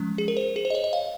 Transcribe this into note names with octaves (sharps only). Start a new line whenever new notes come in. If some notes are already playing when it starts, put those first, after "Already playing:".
Already playing: F3 G#3 C#4
G#4
A#4
C5
G#4
C5
D#5
C#5
D#5
F5